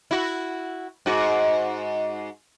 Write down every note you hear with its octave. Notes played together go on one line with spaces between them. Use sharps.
E4 F#4
G#2 F#4